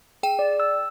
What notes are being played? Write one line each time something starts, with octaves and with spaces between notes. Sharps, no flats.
G#4 G5 E7
D5
E6